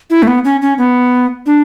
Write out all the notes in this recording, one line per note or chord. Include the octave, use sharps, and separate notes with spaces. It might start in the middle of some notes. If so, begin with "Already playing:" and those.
E4
A3
B3
C#4
C#4
B3
D4